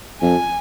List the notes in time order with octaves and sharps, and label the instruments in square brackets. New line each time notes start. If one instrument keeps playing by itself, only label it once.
[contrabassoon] F2 [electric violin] G#5